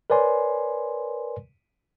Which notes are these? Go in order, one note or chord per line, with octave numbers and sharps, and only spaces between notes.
A#4 B4 C#5 D5 G#5 C6